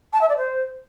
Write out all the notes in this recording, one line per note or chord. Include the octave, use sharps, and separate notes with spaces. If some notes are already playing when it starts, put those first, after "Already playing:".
A5
E5
D5
C5